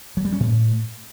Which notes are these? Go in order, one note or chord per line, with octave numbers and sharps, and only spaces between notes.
F#3
G3
C#4
A2